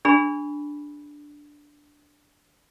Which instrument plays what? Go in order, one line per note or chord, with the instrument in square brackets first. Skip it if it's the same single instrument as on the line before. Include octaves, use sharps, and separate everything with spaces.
[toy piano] D4 G#4 B5